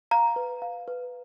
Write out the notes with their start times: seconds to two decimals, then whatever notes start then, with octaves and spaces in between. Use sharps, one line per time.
0.11 F5 A#5
0.36 B4
0.62 F5
0.88 B4